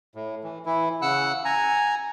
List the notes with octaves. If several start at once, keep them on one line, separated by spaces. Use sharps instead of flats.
A2
E3
E3 E4
C#3 F#5 E6 F#6
G#5 A#5